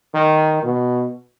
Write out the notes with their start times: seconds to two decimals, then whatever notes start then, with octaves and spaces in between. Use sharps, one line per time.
0.14 D#3
0.63 B2